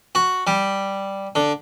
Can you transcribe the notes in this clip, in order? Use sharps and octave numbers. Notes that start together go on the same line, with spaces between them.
F#4
G3
D3